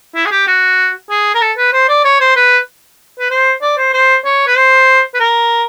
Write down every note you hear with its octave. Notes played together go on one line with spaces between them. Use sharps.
E4
G#4
G4
F#4
G#4
A#4
A4
B4
C5
D5
C#5
C5
B4
B4
C5
D5
C5
C5
C#5
B4
C5
B4
A#4